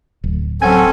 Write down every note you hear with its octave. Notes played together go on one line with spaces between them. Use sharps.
D1
F#3 C4 C#4 A4 F#5 G#5 G#6